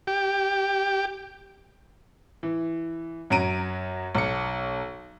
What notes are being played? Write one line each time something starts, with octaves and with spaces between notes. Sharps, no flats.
G4
E3
F#2 F#3 A#5 D7 D#7
B1 C#7